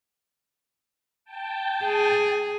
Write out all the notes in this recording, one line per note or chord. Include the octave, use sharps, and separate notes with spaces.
G5 A5
G#4